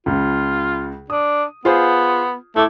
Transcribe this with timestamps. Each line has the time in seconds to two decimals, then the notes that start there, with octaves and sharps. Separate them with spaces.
0.06 C#2 C#3 F4
1.10 D4 D#6
1.65 B3 F4 G#4 C5
2.56 A3 E4 D6